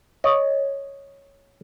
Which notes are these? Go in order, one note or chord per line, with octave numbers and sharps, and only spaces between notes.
C#5 D#5